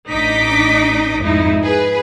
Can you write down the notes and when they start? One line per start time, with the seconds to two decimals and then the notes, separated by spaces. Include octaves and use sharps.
0.10 A1 D4 D#4 D#5 D6 B6
1.23 F2 G#2 D#4 E4
1.64 G#4 B4